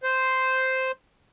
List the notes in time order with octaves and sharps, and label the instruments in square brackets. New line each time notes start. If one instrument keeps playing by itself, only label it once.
[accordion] C5